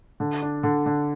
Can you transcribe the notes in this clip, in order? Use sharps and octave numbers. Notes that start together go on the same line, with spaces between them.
D3
D4
D3
D3